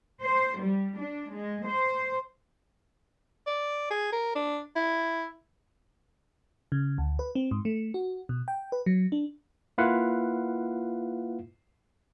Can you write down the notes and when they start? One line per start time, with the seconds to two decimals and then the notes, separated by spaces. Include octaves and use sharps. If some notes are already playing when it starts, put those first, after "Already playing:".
0.21 C5
0.59 G3
0.98 D4
1.33 G#3
1.66 C5
3.47 D5
3.91 G#4
4.13 A#4
4.35 D4
4.76 E4
6.72 C#3
6.98 D2
7.19 B4
7.35 C4
7.51 G#2
7.65 A3
7.94 F#4
8.29 B2
8.48 G5
8.72 B4
8.86 F#3
9.12 D4
9.78 A#3 E4 F4 B4 F5 F#5